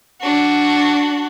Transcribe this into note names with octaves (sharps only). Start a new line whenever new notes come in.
D4 F#4